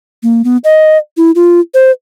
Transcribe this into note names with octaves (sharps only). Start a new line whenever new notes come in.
A#3
B3
D#5
E4
F4
C5